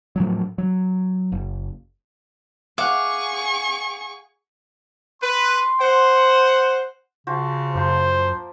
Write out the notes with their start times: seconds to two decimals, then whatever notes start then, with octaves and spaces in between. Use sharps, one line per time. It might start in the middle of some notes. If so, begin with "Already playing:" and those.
0.16 A2 F3 F#3
0.58 F#3
1.32 F#1
2.78 G#4 F5 F#5 C#6 D6
5.22 B4 C6
5.80 C5 F#5
7.27 C#3 F3 F#4 C5
7.75 F#2 F3 A#3 C5